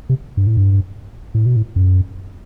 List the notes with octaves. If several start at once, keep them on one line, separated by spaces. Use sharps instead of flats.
C3
G2
A2
G2
A2
B2
A2
F#2